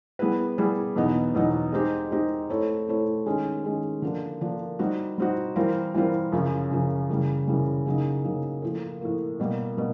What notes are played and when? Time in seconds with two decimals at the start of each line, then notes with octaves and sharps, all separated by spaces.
0.19 G3 B3 E4 G#4 B4
0.58 G3 B3 E4 G#4 B4
0.96 E2 B2 F#3 B3 D#4
1.35 E2 B2 F#3 B3 D#4
1.72 G#3 C4 D#4 G4
2.11 G#3 C4 D#4 G4
2.49 A3 C4 E4 A4 C#5
2.88 A3 C4 E4 A4 C#5
3.26 D#3 G#3 C#4
3.64 D#3 G#3 C#4
4.02 D3 F3 A#3 D4
4.41 D3 F3 A#3 D4
4.79 G3 C4 D#4 F#4
5.18 G3 C4 D#4 F#4
5.56 E3 G3 C4 F4 A#4
5.94 E3 G3 C4 F4 A#4
6.32 F#2 C#3 F3
6.71 F#2 C#3 F3
7.09 F#2 C#3 E3 G3
7.47 F#2 C#3 E3 G3
7.87 C#3 F#3 A#3 D#4
8.24 C#3 F#3 A#3 D#4
8.62 A2 F3 A#3
9.01 A2 F3 A#3
9.40 B2 G3 A#3
9.77 B2 G3 A#3